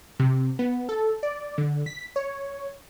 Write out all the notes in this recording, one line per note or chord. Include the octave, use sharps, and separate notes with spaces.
C3
B3
A4
D5
D3
B6
C#5